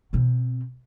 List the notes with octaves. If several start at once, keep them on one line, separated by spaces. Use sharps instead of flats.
B2 C4